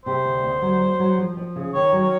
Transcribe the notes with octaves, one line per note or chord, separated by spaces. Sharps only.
C3 C5
D2
D2
F#3
F#3
F#3
F3
F3
C#3
D#3 C#5
F#3
C#5